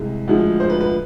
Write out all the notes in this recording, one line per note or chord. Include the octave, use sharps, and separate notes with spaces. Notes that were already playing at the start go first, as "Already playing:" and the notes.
Already playing: C2 C3 G#3
D2 D3 F3 G#3
C5
B4
B4